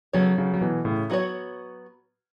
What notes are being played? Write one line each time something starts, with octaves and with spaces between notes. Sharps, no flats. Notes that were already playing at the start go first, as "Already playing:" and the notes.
C#3 F#3 B3 A4 C#5
C#3 F#3
F#3
B2 E3
A2 C#3
F#3 B3 F#4 C#5